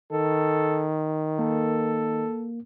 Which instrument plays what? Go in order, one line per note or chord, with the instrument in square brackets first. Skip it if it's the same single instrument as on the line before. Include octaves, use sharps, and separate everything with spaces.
[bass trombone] D#3 [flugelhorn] A4
[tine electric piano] A#3 [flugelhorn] A4